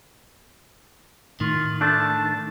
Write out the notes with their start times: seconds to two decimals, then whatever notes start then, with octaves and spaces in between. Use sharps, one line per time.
1.40 A2 D#3 F4
1.81 A3 D4 A5